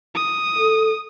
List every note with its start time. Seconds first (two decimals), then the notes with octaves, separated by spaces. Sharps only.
0.15 D#6
0.58 A4